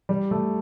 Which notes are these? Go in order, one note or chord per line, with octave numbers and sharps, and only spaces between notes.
G3
A3